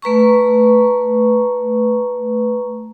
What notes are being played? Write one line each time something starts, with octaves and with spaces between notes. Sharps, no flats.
A3 B4 A#5 C#6